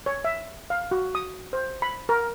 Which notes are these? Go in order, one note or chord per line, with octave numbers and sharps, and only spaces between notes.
C#5
E5
F5
F#4
D#6
C5
B5
A#4